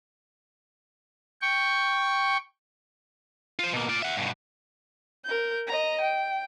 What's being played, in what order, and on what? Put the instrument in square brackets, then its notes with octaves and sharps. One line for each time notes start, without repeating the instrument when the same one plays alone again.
[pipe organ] G5 C#6
[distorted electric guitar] F4 C5
B2 A#3
F4 D5
E5 F#5
G2 B2
[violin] A#4 G6
D#5 A#5
G5